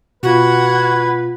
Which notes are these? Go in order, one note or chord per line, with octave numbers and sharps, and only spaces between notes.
B2 F4 F#4 B4 F#5 G#6